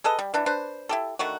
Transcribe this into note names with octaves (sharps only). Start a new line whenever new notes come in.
G#4 A4 B4 D#5
G3
E3 D4 E4
D4 B4 C5
E4 G4 A4
D3 D#3 A3 F#4